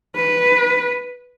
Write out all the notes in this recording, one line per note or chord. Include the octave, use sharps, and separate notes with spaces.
B4